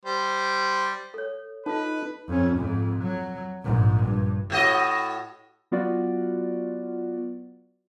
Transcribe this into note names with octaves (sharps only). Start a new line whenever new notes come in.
G3 C5
A4 C#5
D#4 F4 A4 B4 A5
F2 C#4
F2 G#2
F#3
A#1 G#2
G2
A2 F#4 D#5
F#3 B3 F4 F#4 D5